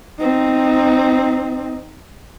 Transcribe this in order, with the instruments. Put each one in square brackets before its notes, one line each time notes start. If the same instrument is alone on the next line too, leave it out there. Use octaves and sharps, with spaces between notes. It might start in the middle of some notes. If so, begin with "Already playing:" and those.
[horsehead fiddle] C4 D#4